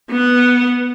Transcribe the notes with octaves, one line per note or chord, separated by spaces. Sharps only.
B3 F#5